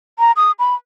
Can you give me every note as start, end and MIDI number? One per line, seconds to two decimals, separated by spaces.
0.19 0.32 82
0.36 0.52 87
0.59 0.75 83